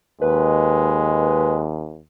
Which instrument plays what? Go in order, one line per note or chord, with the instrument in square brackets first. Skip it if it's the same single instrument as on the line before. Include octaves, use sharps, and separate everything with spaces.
[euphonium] D#2 [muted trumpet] G#3 [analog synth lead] B4